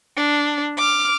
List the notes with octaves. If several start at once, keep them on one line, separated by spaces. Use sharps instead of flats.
D4
D6 F6